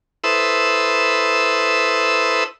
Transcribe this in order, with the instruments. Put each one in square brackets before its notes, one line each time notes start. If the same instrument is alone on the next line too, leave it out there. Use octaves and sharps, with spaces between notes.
[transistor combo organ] E4 A4 B4 C5 D#6 E6